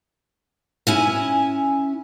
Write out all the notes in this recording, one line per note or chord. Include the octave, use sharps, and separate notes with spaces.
C#4 E4 G#5